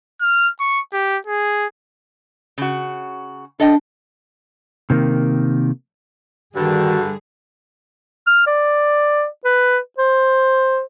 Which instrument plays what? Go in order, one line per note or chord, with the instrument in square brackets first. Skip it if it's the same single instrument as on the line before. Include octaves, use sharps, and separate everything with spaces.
[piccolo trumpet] F6
C#6
G4
G#4
[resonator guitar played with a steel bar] C#3 F#4
[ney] D4 [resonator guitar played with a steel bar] A4 D#5 G5
[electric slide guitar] C3 D#3 A#3
[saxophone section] G2 D3 [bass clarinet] D#3 [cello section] G3 G#4 [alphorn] F#4
[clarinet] F6
D5
B4
C5